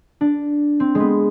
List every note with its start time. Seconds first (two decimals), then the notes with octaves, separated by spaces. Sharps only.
0.21 D4
0.80 C4
0.95 G#3
1.00 B3